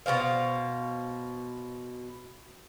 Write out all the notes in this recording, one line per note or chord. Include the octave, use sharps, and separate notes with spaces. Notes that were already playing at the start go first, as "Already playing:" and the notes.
B2 A3 C5 F5